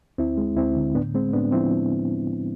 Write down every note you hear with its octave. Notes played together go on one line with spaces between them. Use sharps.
D2 C4 E4
G#3
D2 C4 E4
D3
A2 B3 D4
G#3 C4
A2 B3 D4
F3 C4 E4